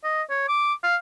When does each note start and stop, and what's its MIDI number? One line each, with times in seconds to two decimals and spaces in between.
0.04 0.23 75
0.30 0.48 73
0.49 0.73 86
0.84 0.96 77